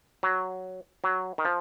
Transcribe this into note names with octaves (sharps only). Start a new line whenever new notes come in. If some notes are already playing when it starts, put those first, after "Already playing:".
F#3
F#3
D#3
F3